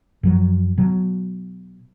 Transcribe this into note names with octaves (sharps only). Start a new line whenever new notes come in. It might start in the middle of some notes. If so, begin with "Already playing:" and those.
F#2 F3 F#3
B2 F#3